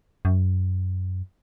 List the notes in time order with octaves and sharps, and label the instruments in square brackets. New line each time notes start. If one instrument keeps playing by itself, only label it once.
[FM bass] F#2